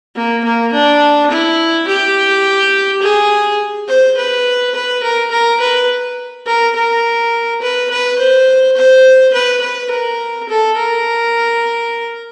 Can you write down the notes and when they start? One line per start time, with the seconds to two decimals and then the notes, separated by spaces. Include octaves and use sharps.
0.16 A#3
0.44 A#3
0.73 D4
1.31 E4
1.87 G4
3.02 G#4
3.88 C5
4.17 B4
4.75 B4
5.03 A#4
5.31 A#4
5.60 B4
6.46 A#4
6.76 A#4
7.62 B4
7.91 B4
8.19 C5
8.77 C5
9.34 B4
9.62 B4
9.91 A#4
10.49 A4
10.77 A#4